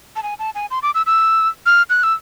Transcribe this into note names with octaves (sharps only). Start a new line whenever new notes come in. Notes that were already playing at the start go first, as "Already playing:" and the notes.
A5
G#5
A5
G#5
C6
D6
E6
E6
F6
F#6
E6